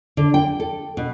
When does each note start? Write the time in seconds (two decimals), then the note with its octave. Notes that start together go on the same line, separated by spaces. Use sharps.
0.17 D3
0.34 G5
0.60 A4
0.97 B2